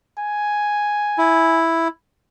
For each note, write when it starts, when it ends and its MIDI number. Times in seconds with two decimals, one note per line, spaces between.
0.19 1.60 80
1.18 1.88 64